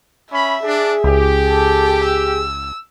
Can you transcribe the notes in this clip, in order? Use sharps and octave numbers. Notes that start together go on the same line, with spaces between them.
C#4 E5 B5
D4 G#4
C#2 G4
A4
E6